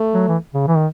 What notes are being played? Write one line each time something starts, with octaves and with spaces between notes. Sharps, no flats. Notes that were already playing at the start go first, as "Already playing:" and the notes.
Already playing: A3
F#3
E3
C#3
E3
D#3